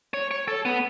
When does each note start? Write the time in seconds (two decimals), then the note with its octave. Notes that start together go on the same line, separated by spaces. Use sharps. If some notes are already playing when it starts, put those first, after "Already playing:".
0.14 C#5
0.31 C#5
0.48 A4
0.65 B3